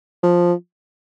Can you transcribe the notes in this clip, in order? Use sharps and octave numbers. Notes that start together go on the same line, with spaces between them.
F3